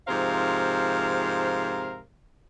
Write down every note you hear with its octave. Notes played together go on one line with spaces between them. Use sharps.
G#2 C3 F3 A#4 C5 F5